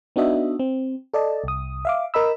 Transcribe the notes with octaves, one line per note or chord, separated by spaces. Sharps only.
B3 D4 D#4 F#4 D#5 E5
C4
A4 D5 D#5 A5
C2 D#6
E5 F5 D6
A#4 D#5 B5 E6